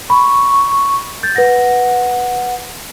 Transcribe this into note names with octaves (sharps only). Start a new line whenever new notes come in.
B5 C#6
G6 A6
B4 F#5 A#6